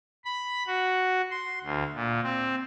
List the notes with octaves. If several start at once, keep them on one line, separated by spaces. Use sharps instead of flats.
B5
F#4
C6
D2
A#2
C4